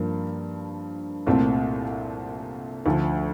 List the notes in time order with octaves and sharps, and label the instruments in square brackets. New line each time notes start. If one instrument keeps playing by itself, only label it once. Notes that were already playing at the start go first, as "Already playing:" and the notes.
Already playing: [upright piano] G2 F3 A#3
C2 A#2 A3 C4
D2 D3 F3 A3